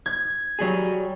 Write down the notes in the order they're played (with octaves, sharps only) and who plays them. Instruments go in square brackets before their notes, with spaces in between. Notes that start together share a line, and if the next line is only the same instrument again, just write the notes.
[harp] G#6
[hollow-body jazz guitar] F#3 G3 G#4